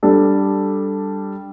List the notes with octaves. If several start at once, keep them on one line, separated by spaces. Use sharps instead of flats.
G3 D4 A4